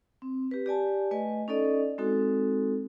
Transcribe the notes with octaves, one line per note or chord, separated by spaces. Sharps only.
C4
G4 B4
G4 D5 G#5 A5
A3 B4 D#5 G#5
C#4 D#4 A4 D5 D#5
G#3 C4 D#4 F#4 A4